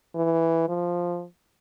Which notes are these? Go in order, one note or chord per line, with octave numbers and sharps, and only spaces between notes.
E3
F3